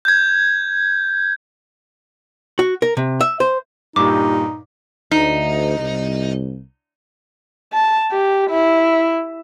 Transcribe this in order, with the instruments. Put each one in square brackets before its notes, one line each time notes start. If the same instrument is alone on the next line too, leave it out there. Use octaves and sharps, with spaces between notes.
[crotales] G6 G#6
[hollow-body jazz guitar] F#4
A#4
C3
E5
C5
[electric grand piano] G2 A#2 [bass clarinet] D#4 [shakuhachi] G4 [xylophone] D6
[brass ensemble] D2 [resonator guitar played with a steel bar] D#4
[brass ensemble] C2
[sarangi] A5
G4
E4